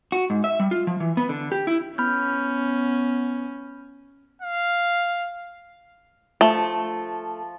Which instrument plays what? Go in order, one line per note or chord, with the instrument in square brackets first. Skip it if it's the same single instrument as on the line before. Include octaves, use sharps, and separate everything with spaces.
[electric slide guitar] F#4
G#2
E5
G3
F4
F3
E3
B3
D3
G4
E4
[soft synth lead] B3 [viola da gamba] C#4 [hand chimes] B5 F6 G6
[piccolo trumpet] F5
[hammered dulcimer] F3 [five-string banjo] A3